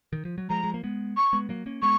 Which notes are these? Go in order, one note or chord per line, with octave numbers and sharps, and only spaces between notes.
D#3
F3
F#3
F3 G#3 A#5
G#3
A#3
G#3 B3
C#6
G#3 B3
F#3 A#3
A#3 C#4
G#3 B3 C#6